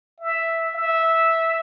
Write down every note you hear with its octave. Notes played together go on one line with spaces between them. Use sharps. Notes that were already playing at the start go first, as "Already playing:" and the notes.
E5
E5